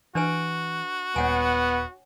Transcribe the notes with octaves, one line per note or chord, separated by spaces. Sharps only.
E3 D4 F#4 B4 G#5
D#1 B3 C#5 F#5 G#5